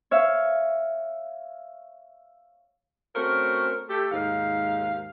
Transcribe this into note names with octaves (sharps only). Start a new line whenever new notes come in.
C#5 E5 F5
A3 C4 C#4 F#4 A#4
A3 G4 A4
D#2 G#2 F5